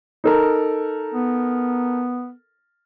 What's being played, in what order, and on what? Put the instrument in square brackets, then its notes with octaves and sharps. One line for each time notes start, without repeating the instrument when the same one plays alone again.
[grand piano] D#4 A4 A#4
[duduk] B3